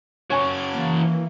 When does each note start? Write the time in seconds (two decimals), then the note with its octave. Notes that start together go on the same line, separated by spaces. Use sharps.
0.30 C#3 F#3 C#5 G#5 C#6 D6 G#6
0.73 E3 A#3